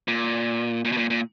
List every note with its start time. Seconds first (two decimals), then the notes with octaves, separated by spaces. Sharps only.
0.08 A#2
0.85 A#2
0.92 B2
0.97 A#2
1.10 A#2